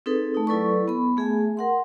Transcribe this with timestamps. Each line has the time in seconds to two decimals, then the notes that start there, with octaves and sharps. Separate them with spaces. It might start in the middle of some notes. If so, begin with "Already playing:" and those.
0.06 C4 D#4 G#4 A4 B4
0.34 A3 D#4
0.47 F#3 E4 A4 B4 D5 C#6
0.88 B3 B5
1.17 A3 G#4 E5 G#5
1.57 A#4 F#5 C6